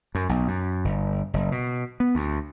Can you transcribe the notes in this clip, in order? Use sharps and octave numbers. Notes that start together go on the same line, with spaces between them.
F#2
B1
F#2
G1
F#1
B2
B3
D2